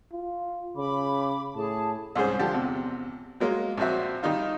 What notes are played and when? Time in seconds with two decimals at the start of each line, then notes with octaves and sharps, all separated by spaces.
0.12 F4
0.76 C#3 B5 D6
1.56 A2 G#4 A5
2.15 C2 G#2 C#4 G#4 C5
2.39 D3 F3 G4
2.53 E2 C3
3.40 F#3 G#3 A#3 F4
3.78 A#1 A#2 C4 F#4 E5
4.23 D#3 G3 D#4 F4